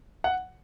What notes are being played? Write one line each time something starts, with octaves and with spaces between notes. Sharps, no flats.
F#5